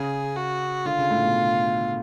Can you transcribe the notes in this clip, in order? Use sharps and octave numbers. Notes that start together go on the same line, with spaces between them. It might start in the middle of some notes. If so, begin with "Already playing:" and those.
Already playing: C#3 G#4
F#4
D3 F4
C#3
A2
B2